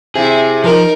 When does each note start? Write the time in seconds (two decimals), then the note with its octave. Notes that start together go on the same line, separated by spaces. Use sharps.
0.15 C3 E4 G#4
0.64 F3 D#4 A#4